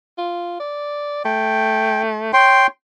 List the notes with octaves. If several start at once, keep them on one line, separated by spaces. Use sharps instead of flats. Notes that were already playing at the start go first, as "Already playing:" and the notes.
F4
D5
A3 G5
C#5 G5 C6